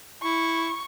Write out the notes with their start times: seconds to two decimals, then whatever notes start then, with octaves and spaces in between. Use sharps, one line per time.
0.22 E4 C#6